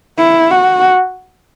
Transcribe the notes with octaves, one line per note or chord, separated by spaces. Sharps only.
E4
F#4